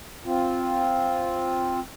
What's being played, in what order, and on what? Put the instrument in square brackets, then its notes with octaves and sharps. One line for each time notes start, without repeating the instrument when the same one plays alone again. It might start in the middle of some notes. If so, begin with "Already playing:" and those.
[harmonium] C4 F4